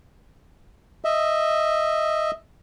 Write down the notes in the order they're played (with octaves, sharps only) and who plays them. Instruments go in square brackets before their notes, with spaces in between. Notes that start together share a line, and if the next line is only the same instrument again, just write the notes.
[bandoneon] D#5 E5